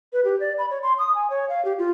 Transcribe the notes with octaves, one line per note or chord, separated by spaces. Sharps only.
B4
G4
D5
B5
C#5
C6
D#6
G#5
C#5
F5
G4
F4